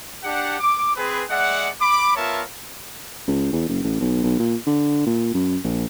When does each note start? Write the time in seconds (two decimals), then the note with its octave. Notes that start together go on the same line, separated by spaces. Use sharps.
0.24 D4 G4 F#5
0.59 D6
0.96 C4 G#4 B4
1.30 G#3 D5 E5 F#5
1.80 B5 D6
2.16 B3 F4 A#4 C#5 E5 A5
3.27 C#2
3.52 E2
3.69 F#1
3.83 A1
4.00 B1
4.23 B1
4.39 A#2
4.66 D3
5.06 A#2
5.34 F#2
5.64 A#1